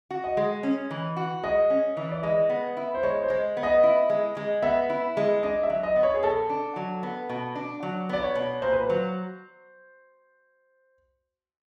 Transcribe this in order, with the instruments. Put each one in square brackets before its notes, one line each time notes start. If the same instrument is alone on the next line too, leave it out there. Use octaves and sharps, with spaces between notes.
[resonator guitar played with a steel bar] F#4
[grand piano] D#5
[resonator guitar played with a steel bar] G#3
C#4
E3
F#4
[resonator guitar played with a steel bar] G#3 [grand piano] D#5
[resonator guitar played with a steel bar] C#4
E3
[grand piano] D5
[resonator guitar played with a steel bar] G#3 [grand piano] D#5
[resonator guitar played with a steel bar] B3
E4
[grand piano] C5
[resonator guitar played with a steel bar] G#3 [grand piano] C#5
[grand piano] C5
[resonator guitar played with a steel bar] G#3
B3
[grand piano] D#5
[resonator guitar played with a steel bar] E4
G#3
G#3
[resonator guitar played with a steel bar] B3 [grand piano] E5
[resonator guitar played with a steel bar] E4
G#3
[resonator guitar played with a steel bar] D4 [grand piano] D#5
[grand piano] E5
[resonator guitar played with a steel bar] F#3
[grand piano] D#5
[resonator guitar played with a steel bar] B3
[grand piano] C#5
G#4
[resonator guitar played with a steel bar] B2 [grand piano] A4
[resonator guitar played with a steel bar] D4
F#3
B3
B2
D4
F#3
[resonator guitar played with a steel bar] B3 [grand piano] D5
[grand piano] C#5
[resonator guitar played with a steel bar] B2
[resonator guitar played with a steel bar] A#2 [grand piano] C5
[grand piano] B4
C5
[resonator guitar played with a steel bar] F#3